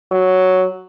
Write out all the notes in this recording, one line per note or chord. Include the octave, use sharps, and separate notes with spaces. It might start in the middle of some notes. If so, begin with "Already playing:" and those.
F#3